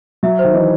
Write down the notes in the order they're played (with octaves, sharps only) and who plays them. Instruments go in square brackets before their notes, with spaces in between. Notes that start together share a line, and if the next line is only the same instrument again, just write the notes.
[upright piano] F#3 [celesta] E5
[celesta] C5
[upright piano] D#3
[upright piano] E3 [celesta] D#5